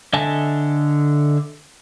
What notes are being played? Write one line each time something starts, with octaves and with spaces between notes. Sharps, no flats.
D3 D#5 E5 G#5 A5